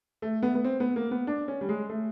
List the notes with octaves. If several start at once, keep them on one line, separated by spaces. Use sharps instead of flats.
A3
B3
B3
C4
B3
A#3
B3
D4
C#4
G3
G#3
A3